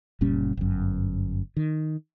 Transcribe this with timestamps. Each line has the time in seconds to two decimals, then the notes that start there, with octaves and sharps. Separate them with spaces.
0.21 F#1 A#2 G3 C#4
0.57 G1 F#2
1.57 D#3